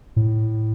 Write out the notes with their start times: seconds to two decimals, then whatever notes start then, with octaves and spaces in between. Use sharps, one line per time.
0.16 A2